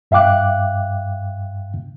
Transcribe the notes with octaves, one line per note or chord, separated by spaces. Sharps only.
G2 E5 F5 G5 D6 F#6